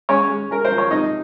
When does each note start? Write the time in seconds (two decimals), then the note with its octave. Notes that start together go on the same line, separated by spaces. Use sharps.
0.09 G#3 C#4 C#5
0.30 G#3
0.51 C#4 A#4
0.65 C5
0.71 F3
0.78 C#5
0.91 C3 D#4 D#5